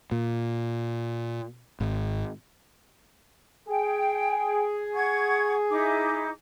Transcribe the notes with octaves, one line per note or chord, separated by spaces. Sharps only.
A#2
G#1
G#4 G5
F#5 C#6 G#6
D#4 E4 D6